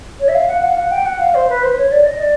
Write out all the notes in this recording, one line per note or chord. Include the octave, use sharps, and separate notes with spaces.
C#5
E5
F5
F#5
F5
F#5
G5
F#5
F5
C5
B4
C5
C5
C#5
D5
D#5
D5